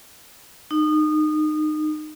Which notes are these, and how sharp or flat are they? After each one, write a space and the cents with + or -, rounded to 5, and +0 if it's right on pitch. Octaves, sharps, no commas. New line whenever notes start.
D#4 -25